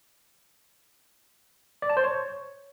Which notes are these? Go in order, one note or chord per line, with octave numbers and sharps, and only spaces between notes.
D5
A5
C5
C#5